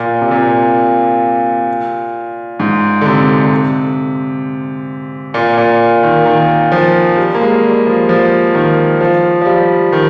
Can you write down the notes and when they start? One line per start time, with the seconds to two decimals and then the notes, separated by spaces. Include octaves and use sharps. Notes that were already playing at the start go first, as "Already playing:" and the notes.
Already playing: A#2
0.22 C3
0.31 A#2
2.60 G#2
3.01 D3
3.06 C3
5.34 A#2
5.57 A#2
6.03 D#3
6.26 D#3
6.72 F3
7.17 G3
7.35 A#3
7.41 G#3
7.63 G3
7.86 F3
8.09 F3
8.55 D#3
9.01 F3
9.41 F3
9.46 G3
9.92 D#3